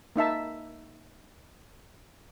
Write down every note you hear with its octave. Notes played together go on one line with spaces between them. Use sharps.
A#3 D#4 E5 A5